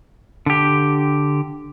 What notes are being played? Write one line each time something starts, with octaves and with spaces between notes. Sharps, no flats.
D3 G4